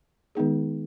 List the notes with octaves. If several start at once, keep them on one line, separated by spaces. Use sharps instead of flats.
D#3 G#3 B3 D#4 G#4